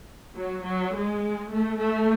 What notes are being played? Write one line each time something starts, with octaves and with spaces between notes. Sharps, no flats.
F#3
F#3
G#3
A3
A3